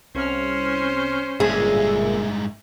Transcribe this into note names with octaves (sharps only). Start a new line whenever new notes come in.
C2 C#4 C5 F6
G1 G2 A#2 G#3 G#4 E5